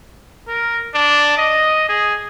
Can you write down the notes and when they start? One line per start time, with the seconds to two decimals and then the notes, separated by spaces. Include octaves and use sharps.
0.48 A#4
0.94 D4
1.37 D#5
1.89 G#4